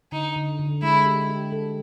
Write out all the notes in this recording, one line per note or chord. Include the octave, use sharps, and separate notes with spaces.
D3 D#4
D3
D3
G#3 E4
G4
G4
A4